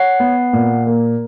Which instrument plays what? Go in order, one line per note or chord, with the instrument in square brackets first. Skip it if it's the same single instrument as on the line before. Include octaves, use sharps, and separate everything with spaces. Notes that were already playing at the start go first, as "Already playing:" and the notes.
Already playing: [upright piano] C#5 [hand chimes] F#5
[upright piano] B3
A#2
A#3